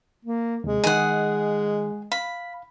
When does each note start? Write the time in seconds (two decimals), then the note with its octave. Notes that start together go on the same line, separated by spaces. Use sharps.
0.25 A#3
0.64 D#2 C3 G#3
0.84 D#3 G#4 D#5 F#5
2.12 F5 B5